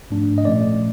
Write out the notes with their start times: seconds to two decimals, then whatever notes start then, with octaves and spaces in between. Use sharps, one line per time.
0.11 G#2 F3 A3 D4
0.38 D#5
0.45 A#2 F3 A3 C#4 D5